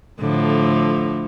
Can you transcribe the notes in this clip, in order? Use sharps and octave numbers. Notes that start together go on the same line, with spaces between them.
A2 D3 F3